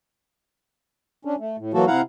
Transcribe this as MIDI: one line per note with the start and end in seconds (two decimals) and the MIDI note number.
1.25 1.35 61
1.25 1.35 62
1.40 1.56 57
1.58 1.72 45
1.74 1.85 52
1.74 1.85 54
1.74 1.85 58
1.74 1.85 66
1.74 1.85 69
1.87 2.01 48
1.87 2.01 64
1.87 2.01 77
1.87 2.01 78
1.87 2.01 82